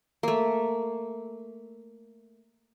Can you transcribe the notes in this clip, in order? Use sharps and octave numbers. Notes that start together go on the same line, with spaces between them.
A3 A#3